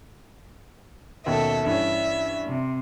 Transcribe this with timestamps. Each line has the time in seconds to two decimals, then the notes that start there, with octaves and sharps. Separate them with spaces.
1.26 D#2 B2 C#4 A4 E5
1.66 G2 E3 C#4 E5
2.46 C3